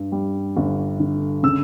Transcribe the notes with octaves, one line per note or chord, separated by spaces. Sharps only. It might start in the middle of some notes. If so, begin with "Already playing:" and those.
Already playing: G2
G3
G1
D3
C#3 E6